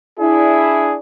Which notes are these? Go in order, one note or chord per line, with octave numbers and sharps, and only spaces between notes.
D4 E4 G#4